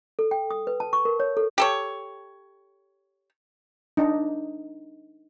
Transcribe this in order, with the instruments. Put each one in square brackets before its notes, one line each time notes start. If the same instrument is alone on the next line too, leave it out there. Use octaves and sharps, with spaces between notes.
[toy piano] A4
G5
D#6
B4
A5
C#6
A#4
C#5
A4
[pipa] G4 A4 C#5
[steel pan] D4 D#4